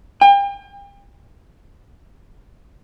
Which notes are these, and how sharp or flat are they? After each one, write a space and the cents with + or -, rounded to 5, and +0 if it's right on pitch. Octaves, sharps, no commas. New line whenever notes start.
G5 +40